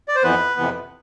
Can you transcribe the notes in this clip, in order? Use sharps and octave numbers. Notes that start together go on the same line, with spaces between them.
D5
C5
F2 E3 B3 B4
F2 C3 E3 B3